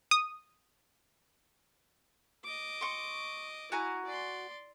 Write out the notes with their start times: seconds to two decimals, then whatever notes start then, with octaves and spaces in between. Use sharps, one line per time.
0.11 D#6
2.44 D#5 D6
2.81 C6 C#6
3.72 E4 F#4 G#5 A#5
4.06 D5 C6